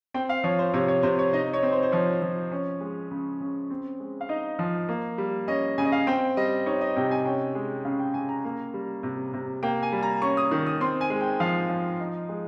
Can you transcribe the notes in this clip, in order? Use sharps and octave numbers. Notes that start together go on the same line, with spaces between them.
C4 G5
F5
F3 C#5
C5
C3 C#5
C#5
C3 C5
C#5
D#4 D#5
C#5
C4
C5
C5
F3 C#5
F3
C#4
G#3
C#3
C#3
C4
G#3
F5
D#4 D#5
F3
A#3
G3
C#4 D#5
C#3 G#5
D#5
F5
C4 G5
G3 D#5
D#4 C#5
D#5
C3 G5
G#5
C#4 G5
G#3
C#3 F5
G5
C#3 G#5
A#5
A#3
G3
C3
C3
A#3 G5
G#5
G3
A#5
C#4 C#6
D#6
D#3
D#6
C4 C6
G#5
G#3
G5
F3 F5
F3
D#4
G#3